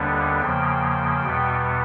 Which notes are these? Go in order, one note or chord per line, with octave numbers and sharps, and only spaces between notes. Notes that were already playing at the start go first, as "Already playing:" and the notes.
Already playing: D#2 D3 G3 B3 D4
E2 C#3 F3 A#3 G5
E2 B2 G3 B3